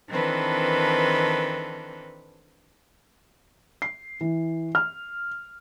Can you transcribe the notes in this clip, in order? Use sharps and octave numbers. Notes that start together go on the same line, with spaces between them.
D#3 E3 C4 D4 A4 B4
C7
E3
F6